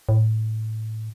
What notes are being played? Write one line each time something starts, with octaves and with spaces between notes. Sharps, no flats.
A2